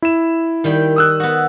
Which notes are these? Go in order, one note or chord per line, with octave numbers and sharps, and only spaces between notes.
E4 E7
D#3 G3 G5
D#6 E6 F#6
B3 F#4